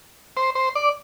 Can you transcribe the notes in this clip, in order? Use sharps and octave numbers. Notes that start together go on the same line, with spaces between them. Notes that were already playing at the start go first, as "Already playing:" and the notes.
C5
C5
D5